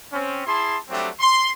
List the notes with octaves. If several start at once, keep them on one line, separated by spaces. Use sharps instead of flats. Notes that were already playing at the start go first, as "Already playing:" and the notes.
C4 C#4
E4 G#4 A5 C6
F#3 G3 A3 C4 D4 G4
C6